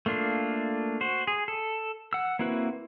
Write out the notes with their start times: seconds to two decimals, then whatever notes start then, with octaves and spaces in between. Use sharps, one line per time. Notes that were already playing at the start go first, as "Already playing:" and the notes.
0.06 A3 A#3 D4 F4
1.01 F#4 C5
1.27 G#4
1.48 A4
2.13 F#5 E6
2.39 A#3 C4 E4 F#4 B4